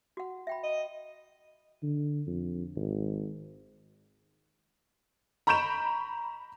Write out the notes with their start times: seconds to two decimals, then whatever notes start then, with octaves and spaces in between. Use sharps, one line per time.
0.17 F#4 F#5
0.47 E5 G5 B5
0.63 D#5
1.83 D3
2.27 F2
2.76 G#1
5.47 A#5 B5 C#6 G6 D7 E7